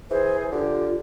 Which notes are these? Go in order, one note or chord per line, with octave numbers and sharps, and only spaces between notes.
E3 G#4 C5
D3 F4 G4